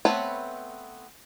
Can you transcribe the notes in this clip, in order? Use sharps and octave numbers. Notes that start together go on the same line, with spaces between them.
A3 B3 C4 B4 C#5